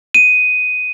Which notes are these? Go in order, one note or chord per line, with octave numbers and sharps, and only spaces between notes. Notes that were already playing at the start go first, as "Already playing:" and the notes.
D#7